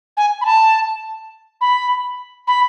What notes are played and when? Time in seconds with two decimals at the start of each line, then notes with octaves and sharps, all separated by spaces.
0.17 G#5
0.41 B5
0.45 A5
1.61 B5
2.48 B5